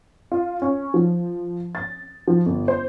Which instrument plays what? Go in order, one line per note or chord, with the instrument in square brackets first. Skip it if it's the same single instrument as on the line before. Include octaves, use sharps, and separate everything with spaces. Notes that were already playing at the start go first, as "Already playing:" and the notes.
[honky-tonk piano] F4
C#4
F3
A6
F3
G1
C5